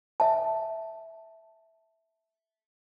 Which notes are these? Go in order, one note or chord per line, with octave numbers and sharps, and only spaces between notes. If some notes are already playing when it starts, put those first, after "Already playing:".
E5 A5